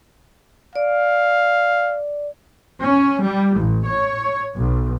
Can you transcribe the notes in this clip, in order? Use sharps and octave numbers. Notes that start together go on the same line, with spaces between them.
D5 F5
C#4
G3
A1
C#5
B1